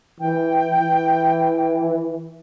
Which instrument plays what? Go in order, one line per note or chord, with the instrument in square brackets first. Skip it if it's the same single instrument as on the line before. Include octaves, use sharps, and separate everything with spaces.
[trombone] E3 [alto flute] G5
[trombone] E3